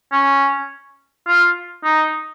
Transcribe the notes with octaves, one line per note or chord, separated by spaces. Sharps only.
C#4
F4
D#4